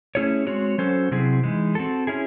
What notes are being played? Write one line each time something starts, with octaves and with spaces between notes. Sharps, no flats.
A3 C#4 E4 G#4 C#5
G#3 C4 F#4 C#5
F#3 C#4 F#4 A4 C5
C3 F#3 C4 E4 G#4
E3 G#3 D#4
C4 F#4 A4
C#4 E4 G#4